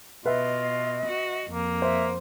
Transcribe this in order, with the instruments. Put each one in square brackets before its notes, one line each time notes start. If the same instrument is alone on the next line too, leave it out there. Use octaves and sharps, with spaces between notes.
[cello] B2 [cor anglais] F4 [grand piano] B4 E5 [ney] D#5
[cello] F#4
[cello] F2 [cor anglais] A#3
[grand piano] C5 [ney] E5